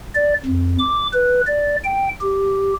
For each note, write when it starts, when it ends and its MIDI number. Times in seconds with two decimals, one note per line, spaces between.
0.15 0.34 74
0.46 0.77 41
0.79 1.07 86
1.14 1.41 71
1.47 1.76 74
1.84 2.09 79
2.21 2.73 67